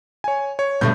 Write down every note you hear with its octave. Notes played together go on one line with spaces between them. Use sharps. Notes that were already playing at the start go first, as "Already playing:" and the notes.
C#5 G#5
C#5
G2 B2 D3 A3 G6